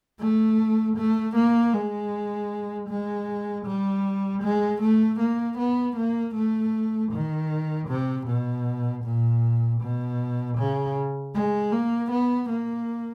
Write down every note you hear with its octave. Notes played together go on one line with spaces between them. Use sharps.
A3
A3
A#3
G#3
G#3
G3
G#3
A3
A#3
B3
A#3
A3
D#3
C3
B2
A#2
B2
C#3
G#3
A#3
B3
A#3